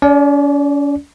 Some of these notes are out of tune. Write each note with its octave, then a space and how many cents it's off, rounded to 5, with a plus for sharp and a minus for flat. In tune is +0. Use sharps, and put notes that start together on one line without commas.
C#4 +40 D5 -5